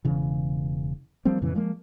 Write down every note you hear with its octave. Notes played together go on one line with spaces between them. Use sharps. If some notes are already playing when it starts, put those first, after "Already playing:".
E1 C#3 E3
F3 G3 A#3 C4
F2 A#2 C#3 E3
F3 G#3 A#3